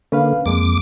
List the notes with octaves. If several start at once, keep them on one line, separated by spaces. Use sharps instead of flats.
D3 A#3 C#4 B4 F5
F2 G#3 A#3 D6